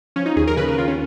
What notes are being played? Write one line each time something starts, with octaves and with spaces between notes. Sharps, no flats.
F3 C#4
D#4
D#2 G#4
A#4
C#3 B4
A#4
D#2 F4
C#4